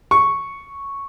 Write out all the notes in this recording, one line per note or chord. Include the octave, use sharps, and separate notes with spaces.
C#6